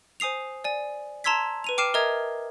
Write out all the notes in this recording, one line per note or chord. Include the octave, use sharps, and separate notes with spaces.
C5 G#5 D#6 C7 F7
D5 G#5
A5 A#5 C6 E6 G#6 B6
B4 D#7 F7
G5 D6 F6 C7 D#7 E7
A#4 D#5 E5 A#5 D#6 G#6